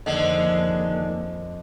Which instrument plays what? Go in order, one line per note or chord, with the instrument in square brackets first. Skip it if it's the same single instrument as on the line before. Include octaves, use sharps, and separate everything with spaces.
[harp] F2 F3 [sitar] D3 G#3 [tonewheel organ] D#3 A#3 [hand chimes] D#5